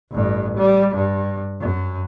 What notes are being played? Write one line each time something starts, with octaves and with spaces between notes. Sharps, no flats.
A1 G2
G3
G2
F#2